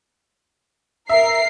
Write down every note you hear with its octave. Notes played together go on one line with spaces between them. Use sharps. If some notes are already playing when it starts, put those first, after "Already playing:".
A#4 E5 C7